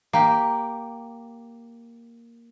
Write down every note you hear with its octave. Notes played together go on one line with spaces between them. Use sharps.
A#3 G4